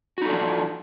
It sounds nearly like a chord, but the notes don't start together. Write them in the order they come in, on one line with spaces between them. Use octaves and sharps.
F#4 D#4 A4 D4 F3